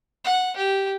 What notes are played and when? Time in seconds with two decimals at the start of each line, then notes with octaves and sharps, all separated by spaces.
0.25 F#5
0.57 G4